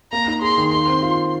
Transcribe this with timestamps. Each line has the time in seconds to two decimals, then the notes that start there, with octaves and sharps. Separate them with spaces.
0.12 A#3 A#5
0.28 D#4
0.42 G#4 C6
0.58 D#3
0.72 D#3 C6
0.88 C4
1.03 F4